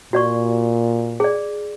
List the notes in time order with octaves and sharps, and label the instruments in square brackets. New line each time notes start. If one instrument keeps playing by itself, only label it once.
[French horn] A#2 [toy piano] F#4 D5 C#6
[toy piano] G#4 D5